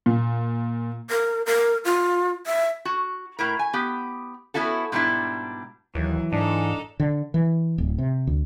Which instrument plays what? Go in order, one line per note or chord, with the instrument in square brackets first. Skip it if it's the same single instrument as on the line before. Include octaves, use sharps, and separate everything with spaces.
[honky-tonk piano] A#2
[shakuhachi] A#4
A#4
F4
E5
[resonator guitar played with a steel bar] F#4
A2 E4 A#4
G#5
B3 G4
B3 C#4 E4 F#4 A4
G#2 B2 G3 D4 E4
[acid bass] D#2 [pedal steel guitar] E3 [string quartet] F#3
[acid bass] G#2 [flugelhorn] D4 [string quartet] D#4 A4
[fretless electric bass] D3
E3
D1
C3
D2